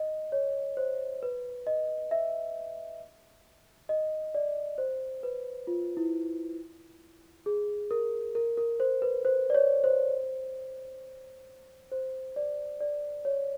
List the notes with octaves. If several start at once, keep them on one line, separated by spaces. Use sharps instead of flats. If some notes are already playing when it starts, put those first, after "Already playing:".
Already playing: D#5
C#5
C5
B4
D#5
E5
D#5
D5
C5
B4
F4
E4
G#4
A#4
A#4
A#4
C5
B4
C5
D5
C#5
C5
C5
D5
D5
C#5